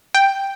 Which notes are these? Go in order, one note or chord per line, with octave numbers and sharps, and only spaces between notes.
G5